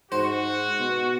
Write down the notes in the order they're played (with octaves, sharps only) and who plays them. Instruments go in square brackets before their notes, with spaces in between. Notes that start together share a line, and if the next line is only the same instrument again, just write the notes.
[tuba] G#2 [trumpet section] F#4 [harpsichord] C5
[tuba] B2